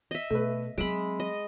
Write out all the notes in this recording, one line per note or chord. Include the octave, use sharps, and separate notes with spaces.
D#5 E5
B2 A3 B4
F#3 G#3 C4 E5 B5 D7
D#5